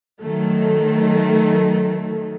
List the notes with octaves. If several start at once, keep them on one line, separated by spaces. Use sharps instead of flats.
D#3 F#3 A3